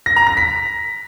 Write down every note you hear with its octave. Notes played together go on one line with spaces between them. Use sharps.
A#6
A#5
A#6
B6